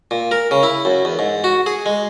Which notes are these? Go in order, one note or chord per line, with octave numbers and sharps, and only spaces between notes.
A#2
A#4
C#3
E4
F#2
E2
G#2
F#4
G#4
G#3